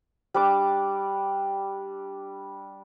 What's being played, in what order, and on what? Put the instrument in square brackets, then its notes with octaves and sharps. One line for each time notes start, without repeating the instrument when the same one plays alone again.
[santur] G3 D4 D6